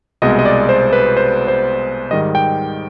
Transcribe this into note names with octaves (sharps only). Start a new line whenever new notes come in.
C2 B2 G#3 D#5
D#5
D5
C5
B4
C5
C5
G#2 D#3 G3 D#5
G5